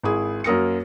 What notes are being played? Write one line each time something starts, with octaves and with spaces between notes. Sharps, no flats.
G#1 E4 G#4
F#2 A#3 A#4 D#6 A#6 C#7